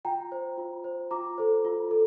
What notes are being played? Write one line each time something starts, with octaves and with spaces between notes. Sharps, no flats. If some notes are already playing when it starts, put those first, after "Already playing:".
F4 G5 A#5
C5
F4
C5
F4 A#5 D6
A4 C5
F4
A4